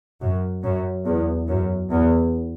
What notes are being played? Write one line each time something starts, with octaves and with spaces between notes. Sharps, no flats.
F#2
F#2
E2
F#2
E2